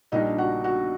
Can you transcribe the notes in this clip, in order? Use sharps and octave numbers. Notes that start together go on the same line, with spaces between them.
A#1 A#2 G3 D4 D#4 D#5
F#4 F#5
F#4 F#5